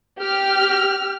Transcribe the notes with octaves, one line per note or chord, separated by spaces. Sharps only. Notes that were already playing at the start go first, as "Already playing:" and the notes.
G4 F6